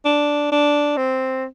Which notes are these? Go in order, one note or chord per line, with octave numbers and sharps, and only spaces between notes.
D4
D4
C4